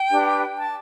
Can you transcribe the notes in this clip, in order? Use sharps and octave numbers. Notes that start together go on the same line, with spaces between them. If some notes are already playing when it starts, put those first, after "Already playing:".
Already playing: G5
D4 G4 B4
A5